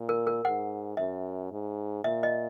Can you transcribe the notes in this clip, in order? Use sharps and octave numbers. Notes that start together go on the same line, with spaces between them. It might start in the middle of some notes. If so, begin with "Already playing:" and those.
Already playing: A#2
A#4
A#4
G#2 F#5
F#2 E5
G#2
A#2 E5
D#5